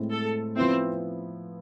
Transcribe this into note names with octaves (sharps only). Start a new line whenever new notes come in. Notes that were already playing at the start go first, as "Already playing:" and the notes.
Already playing: A2 G#3 C4 E4
A4
F3 B3 C4 E4